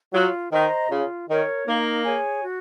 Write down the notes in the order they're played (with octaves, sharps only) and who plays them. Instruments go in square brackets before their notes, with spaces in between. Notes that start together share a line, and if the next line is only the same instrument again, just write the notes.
[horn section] F#3 [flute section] F4
[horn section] D#3 [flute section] C5 D#5 A#5
[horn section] C#3 [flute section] F4
[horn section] D#3 [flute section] A#4 C#5
[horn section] A#3 [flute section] D#4
[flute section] G#4 C#5 G#5
F#4